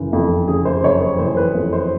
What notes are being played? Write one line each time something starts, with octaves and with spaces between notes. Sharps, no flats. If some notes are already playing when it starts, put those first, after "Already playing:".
Already playing: F#1 C#3 E3
F2
C#3 G#4
C5
F#1 C#5
C5
E3 C5
B4
F2
C5